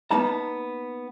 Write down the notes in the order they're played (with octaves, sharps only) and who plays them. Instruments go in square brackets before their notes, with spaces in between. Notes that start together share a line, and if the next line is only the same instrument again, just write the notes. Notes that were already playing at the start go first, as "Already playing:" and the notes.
[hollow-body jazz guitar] A#3 B3 D#4 A5 A#5